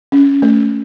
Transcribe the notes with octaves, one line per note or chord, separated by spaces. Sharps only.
C#4
A3